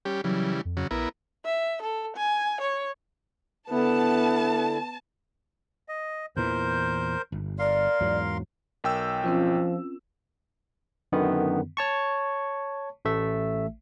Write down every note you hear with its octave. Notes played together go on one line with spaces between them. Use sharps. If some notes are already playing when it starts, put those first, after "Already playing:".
G3 C#4 G4
C#3 E3 F#3 G3
F2
C#3 F#3
A#1 B3 E4 A#4
E5
A4
G#5
C#5
D3 B3 E4 A5
D#5
E2 A#2 E3 A#4 C5 G6
G1
A#4 D5 F5 C6
E2 G#2 F#3
B1 A#4 G5 E6
F3 C4 C#4 F4
F#2 D3 D#3 B3
C#5 A5 C#6
A1 A3 E5